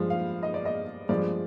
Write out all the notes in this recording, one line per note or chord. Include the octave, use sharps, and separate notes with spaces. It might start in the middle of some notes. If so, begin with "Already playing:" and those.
Already playing: G2 F3 G#3
F5
D#5
D5
D#5
G2 F3 G#3 D5